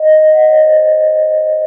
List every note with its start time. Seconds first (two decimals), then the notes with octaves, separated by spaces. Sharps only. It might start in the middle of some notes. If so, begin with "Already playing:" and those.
Already playing: D#5
0.12 D#5
0.31 F#5
0.44 D#5
0.49 C#5
0.62 C5
0.74 D#5